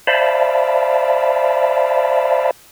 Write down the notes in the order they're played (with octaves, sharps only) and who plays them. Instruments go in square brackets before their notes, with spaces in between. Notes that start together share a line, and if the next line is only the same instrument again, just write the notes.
[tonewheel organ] C5 D5 E5 F5 A5 B5